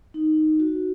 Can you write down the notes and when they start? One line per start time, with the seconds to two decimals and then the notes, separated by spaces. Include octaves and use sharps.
0.14 D#4
0.60 F#4